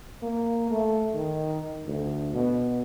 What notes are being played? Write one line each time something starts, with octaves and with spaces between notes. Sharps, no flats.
A#3
A3
D#3
D2
B2